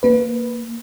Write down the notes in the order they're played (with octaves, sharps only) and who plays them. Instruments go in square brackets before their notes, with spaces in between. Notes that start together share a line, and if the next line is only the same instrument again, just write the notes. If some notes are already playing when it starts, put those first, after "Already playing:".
[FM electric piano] A#3 B4